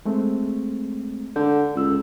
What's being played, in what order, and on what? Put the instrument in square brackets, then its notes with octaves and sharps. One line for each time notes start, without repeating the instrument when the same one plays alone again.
[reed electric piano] G#3 A3 C4
[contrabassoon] D3 [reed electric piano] G6
[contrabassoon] C#2 [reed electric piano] A4 E6